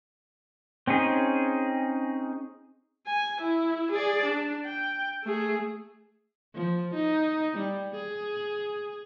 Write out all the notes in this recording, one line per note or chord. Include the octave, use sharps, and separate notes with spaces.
C4 C#4 D#4 G#4
G#5
E4
G#4 D5
D4
G5
A3 G#4
F3
D#4
G3
G#4